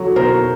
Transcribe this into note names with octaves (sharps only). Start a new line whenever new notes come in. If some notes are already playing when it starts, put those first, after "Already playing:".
Already playing: F#3 A3
B2 A#4 C5